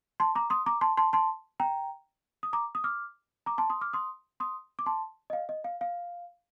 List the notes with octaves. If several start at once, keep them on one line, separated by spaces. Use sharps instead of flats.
A5 C6
A#5 D6
C6 D#6
A#5 D6
A5 C6
A5 C6
A5 C6
G5 A#5
D#6
A#5 D6
D#6
D6 F6
A#5 D6
A5 C6
C6 D#6
D6 F6
C6 D#6
C6 D#6
D6
A5 C6
D#5
F5
D#5
F5
F5